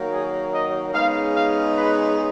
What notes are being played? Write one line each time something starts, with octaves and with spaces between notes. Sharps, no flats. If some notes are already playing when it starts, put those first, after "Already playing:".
Already playing: D#3 F#3 A#3
G#4
D#5
C#3 G#3 B3 D#4 F5
F5
B4